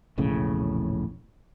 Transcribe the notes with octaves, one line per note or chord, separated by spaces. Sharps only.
E1 A#1 A2 C#3